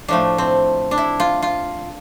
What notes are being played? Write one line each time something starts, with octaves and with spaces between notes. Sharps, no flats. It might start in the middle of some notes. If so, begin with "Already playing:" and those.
A2 F3 A3 D4
C4
D4
E4
F4
F4